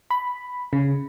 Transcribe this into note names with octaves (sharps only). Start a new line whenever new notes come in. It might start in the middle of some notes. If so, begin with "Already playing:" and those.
B5
C#3